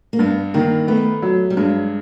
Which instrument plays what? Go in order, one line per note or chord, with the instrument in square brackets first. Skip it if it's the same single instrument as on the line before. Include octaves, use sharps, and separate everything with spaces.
[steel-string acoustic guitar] A#3
[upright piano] G2 [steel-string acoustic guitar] B3
[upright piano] D#3 [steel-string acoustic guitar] A#3
[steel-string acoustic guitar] A3 [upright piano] B3
[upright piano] F#3
[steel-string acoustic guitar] G3
[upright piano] G2 [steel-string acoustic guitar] G#3